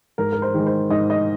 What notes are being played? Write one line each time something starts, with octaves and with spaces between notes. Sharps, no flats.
G#2 A#4
A#4
C5
D#3 G#3
C5
G#2 D#5
D#5